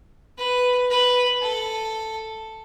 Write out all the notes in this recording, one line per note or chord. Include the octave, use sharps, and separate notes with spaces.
B4
B4
A4